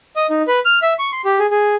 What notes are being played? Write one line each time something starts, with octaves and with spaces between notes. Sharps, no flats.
D#5
D#4
B4
F6
E5
C#6
C6
G4
G#4
G#4